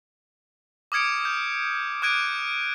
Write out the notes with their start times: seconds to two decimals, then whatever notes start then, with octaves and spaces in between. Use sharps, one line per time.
0.92 D6 D#6 F6 G#6 C#7 D7
1.25 G6
2.02 D6 F#6 G#6 D7 D#7